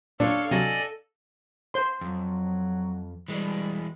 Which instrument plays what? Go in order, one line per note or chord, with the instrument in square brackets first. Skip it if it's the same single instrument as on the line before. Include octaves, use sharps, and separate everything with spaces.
[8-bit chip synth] A#2 [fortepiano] D4 [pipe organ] A4 [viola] C#5 F5
[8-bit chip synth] C3 F#3 [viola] A4 [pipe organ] D5 D#5 G#5
[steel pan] C5 C6
[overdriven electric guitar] F2 [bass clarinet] F#3
[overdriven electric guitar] E3 G#3 [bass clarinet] G3